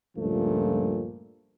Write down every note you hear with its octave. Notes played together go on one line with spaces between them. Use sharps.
C#2 G2 A#2 F3 A3